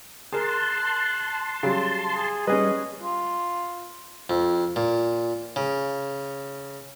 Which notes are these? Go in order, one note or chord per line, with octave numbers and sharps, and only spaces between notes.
G#4 A#4 A5 C6 F#6
C#3 F#3 G3
G#4
G3 C#4 G#4 B4 D#5
F4
F2
A#2
C#3